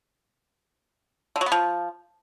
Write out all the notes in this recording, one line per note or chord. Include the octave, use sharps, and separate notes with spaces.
D3
F#3
B3
F3